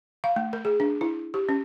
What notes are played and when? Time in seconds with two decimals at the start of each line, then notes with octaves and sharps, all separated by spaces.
0.24 F5
0.36 A3
0.53 A#4
0.65 G#4
0.80 D4
1.01 E4
1.34 G4
1.49 C#4